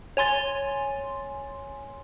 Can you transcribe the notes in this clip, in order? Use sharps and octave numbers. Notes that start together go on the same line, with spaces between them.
C#5 G#5 C6 A6